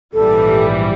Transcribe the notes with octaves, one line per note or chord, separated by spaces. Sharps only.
A#1 G#2 E3 G3 A4